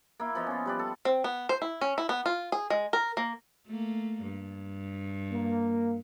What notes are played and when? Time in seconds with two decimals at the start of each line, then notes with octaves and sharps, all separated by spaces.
0.20 A#3 E4
0.35 F3 B3 D#5
0.47 C#4 F4
0.66 G3 B4 D5
0.79 A4
1.05 C4
1.24 B3
1.49 C5
1.62 E4
1.81 C#4
1.98 E4
2.09 B3
2.26 F4
2.52 G#4
2.70 G#3
2.93 A#4
3.17 A#3
3.66 A3 A#3
4.23 G2
5.31 A#3